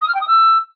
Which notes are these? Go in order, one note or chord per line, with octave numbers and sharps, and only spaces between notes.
D#6
F6
G5
D#6
E6